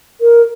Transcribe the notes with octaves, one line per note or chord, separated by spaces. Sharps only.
A#4